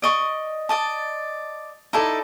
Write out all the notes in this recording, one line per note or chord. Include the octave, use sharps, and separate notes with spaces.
D5 D#5 C#6
D5 D#5 A5
D#4 E4 A4 D5